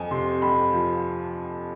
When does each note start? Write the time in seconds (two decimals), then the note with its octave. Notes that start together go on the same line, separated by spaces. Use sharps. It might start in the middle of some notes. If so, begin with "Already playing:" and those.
Already playing: F2 G#5
0.11 C3 C6
0.42 F2 B5
0.73 F3